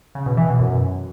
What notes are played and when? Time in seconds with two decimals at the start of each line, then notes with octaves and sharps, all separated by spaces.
0.15 C#3
0.26 B2
0.37 E3
0.48 B2
0.59 F#2